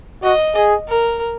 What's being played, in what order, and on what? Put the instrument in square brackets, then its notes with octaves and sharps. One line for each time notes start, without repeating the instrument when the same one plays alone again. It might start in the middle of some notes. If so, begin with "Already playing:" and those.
[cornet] F#4 [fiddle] D#5
[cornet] G#4
[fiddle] A#4